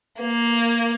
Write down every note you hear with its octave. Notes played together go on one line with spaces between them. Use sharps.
A#3